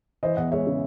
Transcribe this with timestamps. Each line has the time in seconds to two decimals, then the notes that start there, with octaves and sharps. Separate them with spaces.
0.23 E3 C5 D#5
0.37 E2 D#5 F#5
0.52 G#3 C#5 E5
0.67 C#3